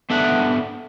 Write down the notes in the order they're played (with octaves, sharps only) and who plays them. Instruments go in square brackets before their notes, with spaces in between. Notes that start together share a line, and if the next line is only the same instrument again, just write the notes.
[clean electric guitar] B3 D4 A4 E5 F#5